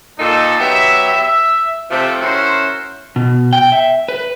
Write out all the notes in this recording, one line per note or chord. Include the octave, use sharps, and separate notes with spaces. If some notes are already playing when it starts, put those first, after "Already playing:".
A#2 D#4 A4
F#3 B3 G4 E5
E5
C3 F3 A3
C#4 E4 F#4 A#4 C5
B2
G5
E5
B4